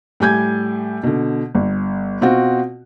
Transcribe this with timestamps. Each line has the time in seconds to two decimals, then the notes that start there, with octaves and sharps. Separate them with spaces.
0.20 A2 G3 G#5 G6 G#6
1.03 B2 D3
1.55 G1
2.21 B2 C4 F4 F#4